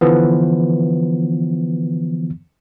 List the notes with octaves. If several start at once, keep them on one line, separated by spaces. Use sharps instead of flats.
D3 E3 F3 B3